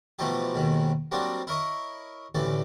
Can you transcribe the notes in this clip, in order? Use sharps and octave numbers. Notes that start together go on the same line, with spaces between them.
B2 E3 F3 A3 D#4 G4
D#2 G#2 B2 D#3
F#3 G3 A#3 C4 D4
E4 A#4 C#5 D#5
A1 D2 E3 A3 D5